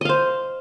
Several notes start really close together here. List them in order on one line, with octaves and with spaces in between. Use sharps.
D#5 F5 C5